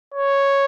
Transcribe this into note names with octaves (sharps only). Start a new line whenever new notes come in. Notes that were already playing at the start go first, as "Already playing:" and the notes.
C#5